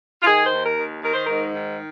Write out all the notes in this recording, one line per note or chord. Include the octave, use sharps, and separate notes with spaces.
F4
D#3 G#4
C5
D#2
A#4
D#3
D#3 A#4
C5
G#2 A#4
D#3